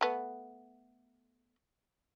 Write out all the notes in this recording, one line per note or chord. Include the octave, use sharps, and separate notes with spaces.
A3 B3